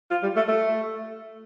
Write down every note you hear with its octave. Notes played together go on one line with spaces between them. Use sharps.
F4
G3
A3
A3